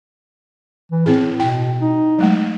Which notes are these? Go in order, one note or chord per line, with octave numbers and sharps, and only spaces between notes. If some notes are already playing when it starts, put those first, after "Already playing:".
E3
A2 C4 G#4
B2 E4 G5
D#4
F#3 G#3 A3